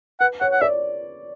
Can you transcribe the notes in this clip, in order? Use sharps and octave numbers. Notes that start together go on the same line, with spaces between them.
B4 F#5
C#5 F#5
F#5
D5 E5